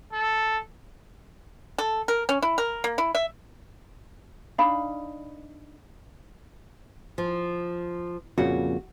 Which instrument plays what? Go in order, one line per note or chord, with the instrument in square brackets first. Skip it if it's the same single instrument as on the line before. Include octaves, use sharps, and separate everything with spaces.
[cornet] A4
[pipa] A4
A#4
C#4
E4
A#4
A#3
E4
E5
[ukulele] D4 D#4 F5 B5
[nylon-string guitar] F3
[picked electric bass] F2 A#2 C#3 [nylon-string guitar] F#4